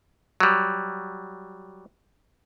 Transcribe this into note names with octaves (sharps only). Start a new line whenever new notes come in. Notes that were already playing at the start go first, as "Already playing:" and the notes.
F#3 G3